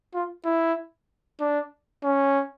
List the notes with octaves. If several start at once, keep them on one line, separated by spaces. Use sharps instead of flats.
F4
E4
D4
C#4